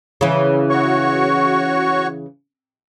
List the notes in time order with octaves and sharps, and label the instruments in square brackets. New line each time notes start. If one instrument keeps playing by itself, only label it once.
[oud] C#3 E3
[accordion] F#4 C#5 C#6